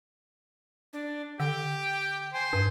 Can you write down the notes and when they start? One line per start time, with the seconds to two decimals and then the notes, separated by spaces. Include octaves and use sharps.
0.93 D4
1.40 D3 G4 G5
2.34 C5 G#5
2.53 G2